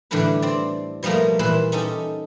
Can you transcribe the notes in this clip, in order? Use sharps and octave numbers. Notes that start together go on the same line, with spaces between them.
A2 D3 E3 G3 D4 B4
C4 D5
B2 F3 G3 A3 A#3
A#2 E3 B4 E5 B5 C6
C#4 D#4 G4 A4